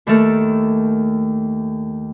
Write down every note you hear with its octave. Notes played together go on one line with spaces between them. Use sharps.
D#2 D#3 A3 A4 A#4